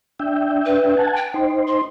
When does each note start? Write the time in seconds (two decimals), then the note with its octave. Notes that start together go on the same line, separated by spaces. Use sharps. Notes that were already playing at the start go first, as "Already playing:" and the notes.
0.19 D4 E5 G5
0.65 B4
0.97 F#5 G#5 A5
1.17 G5
1.34 D#4 C5
1.67 C6